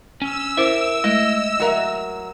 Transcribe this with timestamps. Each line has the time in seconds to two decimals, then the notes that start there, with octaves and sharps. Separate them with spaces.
0.22 C#4 E6
0.57 E4 A#4 C5 E5 D6
1.04 G#3 A3 E4 D#5
1.60 F#3 A#4 E5